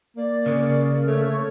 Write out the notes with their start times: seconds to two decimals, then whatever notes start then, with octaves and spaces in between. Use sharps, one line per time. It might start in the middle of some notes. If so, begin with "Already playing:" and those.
0.17 A#3 D5
0.46 C#3 A#4
1.07 A3 C#5